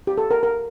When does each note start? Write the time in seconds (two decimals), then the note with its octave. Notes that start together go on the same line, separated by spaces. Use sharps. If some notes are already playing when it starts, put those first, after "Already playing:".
0.07 G4
0.18 A4
0.31 A#4
0.43 A#4